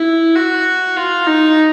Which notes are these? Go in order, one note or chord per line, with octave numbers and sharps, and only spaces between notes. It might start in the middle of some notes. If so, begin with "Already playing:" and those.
Already playing: E4
F#4
F4
D#4